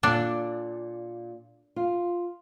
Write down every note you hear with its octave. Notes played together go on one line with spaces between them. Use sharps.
A#2 D4 A4 D5
F4